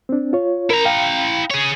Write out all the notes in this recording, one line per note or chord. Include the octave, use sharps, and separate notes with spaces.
C4 D4
F4 C#5
E4 A#4 A#5
F5 G5
G#4 C#5